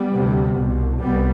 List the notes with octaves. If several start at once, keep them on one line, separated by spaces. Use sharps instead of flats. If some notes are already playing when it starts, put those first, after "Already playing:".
Already playing: G3 B3
D2 C3
C2 B2
C2 G3 B3